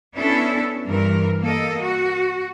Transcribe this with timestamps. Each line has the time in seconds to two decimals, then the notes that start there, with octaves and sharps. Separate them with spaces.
0.15 B3 C#4 D4 E4 A4
0.85 G2 E3 A#4
1.40 A#3 A4 D#5
1.81 F#4